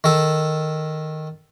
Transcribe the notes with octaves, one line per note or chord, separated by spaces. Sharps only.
D#3 A4